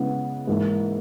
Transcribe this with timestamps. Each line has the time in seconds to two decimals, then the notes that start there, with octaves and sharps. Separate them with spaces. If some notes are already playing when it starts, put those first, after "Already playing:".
Already playing: C#3 G#3 B3 E4
0.47 G#2 E3 A#3 E4